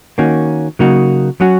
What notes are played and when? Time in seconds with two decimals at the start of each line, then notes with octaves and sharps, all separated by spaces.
0.18 D#3 A#3 C#4 F#4
0.79 C#3 F#3 A#3 D#4 F#4
1.40 F#3 C#4 F#4